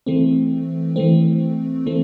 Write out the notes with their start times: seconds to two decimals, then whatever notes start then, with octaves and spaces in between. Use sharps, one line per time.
0.06 E3 A3 C4
0.96 E3 A3 C4
1.86 E3 A3 C4